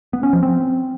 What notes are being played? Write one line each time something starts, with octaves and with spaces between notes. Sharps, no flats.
B3
C#4
F3
C4